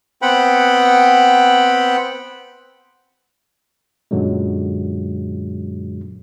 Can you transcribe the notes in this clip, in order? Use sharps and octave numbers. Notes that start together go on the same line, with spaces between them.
B3 C4 F#5 G5 B5
F#2 A#2 D3 F#3 G#3